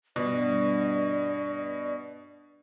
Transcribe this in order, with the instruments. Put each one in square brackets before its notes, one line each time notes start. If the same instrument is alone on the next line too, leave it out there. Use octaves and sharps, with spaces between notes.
[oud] G2 [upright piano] B2 [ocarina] D5